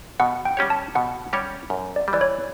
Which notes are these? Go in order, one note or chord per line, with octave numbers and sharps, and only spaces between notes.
B2 F#5
G5
G3 C#4 G4 C#5
A5
B2 F#5
G3 C#4 G4 C#5
F#2
D5
G3
E3 D5
C#5